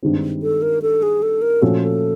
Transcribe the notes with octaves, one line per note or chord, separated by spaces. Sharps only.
G2 D#3 G#3 C4
A4
A#4
A4
G#4
A4
A#4
A#2 F3 A3 C#4 F#4 A4
A4